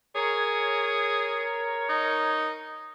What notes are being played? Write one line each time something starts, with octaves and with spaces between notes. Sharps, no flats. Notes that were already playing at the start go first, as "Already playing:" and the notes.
G#4 A#4 C#5
D#4